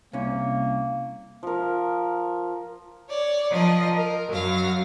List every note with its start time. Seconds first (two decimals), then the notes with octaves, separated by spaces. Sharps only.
0.13 C2 A#3 C#4
1.43 F3 A#4
3.09 C#5 D5
3.51 F3 A#4 D#5
3.96 A#4
4.30 F#2 F#3 F5 A#6